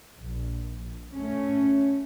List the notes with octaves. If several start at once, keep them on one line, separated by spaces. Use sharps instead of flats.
A#1
A3 C#4